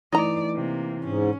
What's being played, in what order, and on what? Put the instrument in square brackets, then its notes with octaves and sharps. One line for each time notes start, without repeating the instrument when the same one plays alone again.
[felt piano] E3 [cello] A3 D5 [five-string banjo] D#4 D#5 A#5
[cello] C3 A#3
[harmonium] G#2 [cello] C#4